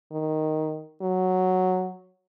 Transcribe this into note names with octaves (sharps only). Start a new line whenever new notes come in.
D#3
F#3